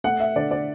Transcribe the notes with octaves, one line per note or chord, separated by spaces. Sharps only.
A3 F#5
E5
D3 D5
D5